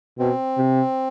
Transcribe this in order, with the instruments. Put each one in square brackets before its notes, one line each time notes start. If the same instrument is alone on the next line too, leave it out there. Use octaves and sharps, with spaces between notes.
[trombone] B2 [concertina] C4
[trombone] C3